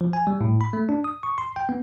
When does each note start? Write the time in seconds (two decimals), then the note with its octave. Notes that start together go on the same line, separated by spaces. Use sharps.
0.01 F3
0.13 G#5
0.27 G3
0.41 A2
0.61 B5
0.73 A3
0.89 D4
1.04 D#6
1.23 C#6
1.38 C6
1.56 G5
1.69 B3